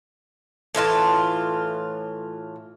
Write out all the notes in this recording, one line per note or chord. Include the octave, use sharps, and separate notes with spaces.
A2 E3 F4 A5